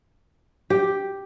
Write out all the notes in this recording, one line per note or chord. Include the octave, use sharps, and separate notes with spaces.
G4